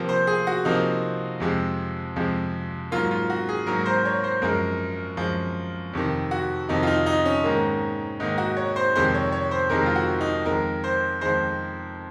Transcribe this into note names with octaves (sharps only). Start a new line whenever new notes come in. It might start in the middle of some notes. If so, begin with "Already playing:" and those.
Already playing: C3 F3 A#3
C5
G#4
F#4
C3 F3 A#3 D#4
F2 C3 F3 G#3
F2 C3 F3 G#3
G#2 F#3 A#3 F4
F4
F#4
G#4
G#2 F#3 A#3 A#4
C5
C#5
C5
F#2 F3 G#3 A#4
F#2 F3 G#3
F2 C3 D#3
F#4
F2 C3 D#3 D#4
F4
D#4
D#4
C#4
G#2 D#3 A#3
G#2 D#3 A#3 D#4
F#4
C#5
C5
F2 C3 D#3 G#3 C5
C#5
C#5
C5
F2 C3 D#3 G#3 A#4
F4
F#4
D#4
F2 D#3 G#3 A#4
C5
F2 D#3 G#3 C5